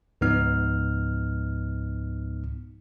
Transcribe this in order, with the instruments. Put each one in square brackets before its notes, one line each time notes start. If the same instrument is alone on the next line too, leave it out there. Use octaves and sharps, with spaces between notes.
[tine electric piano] C#2 G#2 F3 B3 D#4 F6